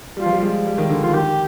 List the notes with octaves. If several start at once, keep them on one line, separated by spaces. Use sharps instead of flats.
G3 F4
F3
G3
G#3
G3
D#3
D3
F3 F4
D#3 G4